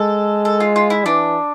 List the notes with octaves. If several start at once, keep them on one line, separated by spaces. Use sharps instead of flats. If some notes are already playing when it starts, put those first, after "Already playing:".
Already playing: G#3 A4
A4
F4
F4
E4
E3 D4